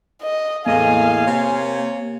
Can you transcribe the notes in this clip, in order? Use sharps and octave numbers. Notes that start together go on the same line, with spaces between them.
D#5
E2 A2 A#3 D#5 F5 G#5
C3 C5 C#5